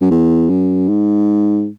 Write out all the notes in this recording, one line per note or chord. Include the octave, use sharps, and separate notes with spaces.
F#2
E2
F#2
G#2